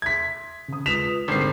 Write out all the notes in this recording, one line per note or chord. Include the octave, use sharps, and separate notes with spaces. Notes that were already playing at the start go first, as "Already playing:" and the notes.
E5 C6 G#6 B6
C#3 D#6
G#3 F4 B4 D#6 B6 E7 F7
G#1 D3 G3 C4 A#4 C7